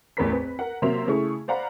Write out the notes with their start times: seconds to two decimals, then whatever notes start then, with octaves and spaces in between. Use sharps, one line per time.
0.17 A1 E2 A2 A#4 B5 B6
0.31 C4 B4
0.59 A#4 F#5
0.82 C3 F#3 A#3 E5 C6 F7
1.07 C#3 A3 E4 G#4 C#6
1.48 C5 D5 F5 F#5 A#5 B5